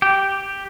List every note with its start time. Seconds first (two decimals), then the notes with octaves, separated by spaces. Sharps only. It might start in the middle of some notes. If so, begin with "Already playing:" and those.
0.02 G4